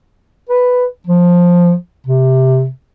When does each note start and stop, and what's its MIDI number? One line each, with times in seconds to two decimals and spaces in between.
0.49 0.85 71
1.07 1.74 53
2.06 2.69 48